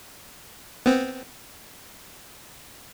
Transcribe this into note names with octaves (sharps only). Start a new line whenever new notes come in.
B3 C4